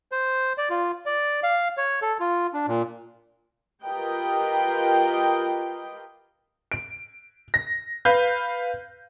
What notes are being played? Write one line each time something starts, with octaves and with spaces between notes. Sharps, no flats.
C5
D5
F4
D5
F5
C#5
A4
F4
D4
A#2
F4 G4 A#4 B4 D#5 G5
D7
A#6
B4 F5 G6